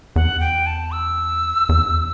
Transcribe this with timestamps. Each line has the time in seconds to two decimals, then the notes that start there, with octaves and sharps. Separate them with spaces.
0.16 E2 F#5
0.41 G5
0.67 A5
0.92 E6
1.69 E2